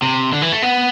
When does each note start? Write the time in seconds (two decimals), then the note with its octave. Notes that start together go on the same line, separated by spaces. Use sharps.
0.02 C3
0.33 D3
0.42 E3
0.52 A3
0.62 B3